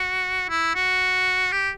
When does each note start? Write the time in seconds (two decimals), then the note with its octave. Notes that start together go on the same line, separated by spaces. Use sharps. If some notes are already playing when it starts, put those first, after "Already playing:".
Already playing: F#4
0.49 E4
0.75 F#4
1.52 G4